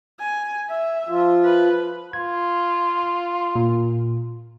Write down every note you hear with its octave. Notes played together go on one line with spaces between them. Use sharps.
G#5
E5
F3 F4
B4
F4 G#6
A#2